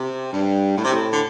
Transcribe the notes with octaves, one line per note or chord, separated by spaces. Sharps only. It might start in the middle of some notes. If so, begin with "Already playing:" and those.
Already playing: C3
G2
A2
C3
A2
D3